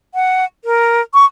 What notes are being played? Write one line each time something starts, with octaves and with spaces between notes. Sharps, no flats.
F#5
A#4
C#6